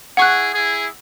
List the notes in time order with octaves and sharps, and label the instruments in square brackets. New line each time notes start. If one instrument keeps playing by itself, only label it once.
[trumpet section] E4 G#4 [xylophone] F#5 C#6 F#6
[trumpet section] E4 G#4